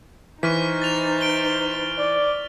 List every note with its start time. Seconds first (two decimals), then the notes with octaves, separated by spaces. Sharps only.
0.43 E3 D#4 C5 C#6 F6 B6
0.82 A6 F7
1.21 F6 D7 G7
1.99 D5